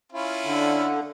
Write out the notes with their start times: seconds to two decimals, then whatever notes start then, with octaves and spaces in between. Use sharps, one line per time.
0.12 C#4 E4 F4
0.45 D3